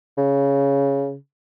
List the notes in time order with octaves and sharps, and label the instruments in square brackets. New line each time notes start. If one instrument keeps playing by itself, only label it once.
[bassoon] C#3